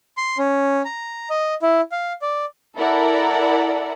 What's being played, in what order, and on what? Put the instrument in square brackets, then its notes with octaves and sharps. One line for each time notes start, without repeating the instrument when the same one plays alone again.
[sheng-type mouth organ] C6
C#4
A#5
D#5
E4
F5
D5
[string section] E4 A4 A#4 D5 E5 F#5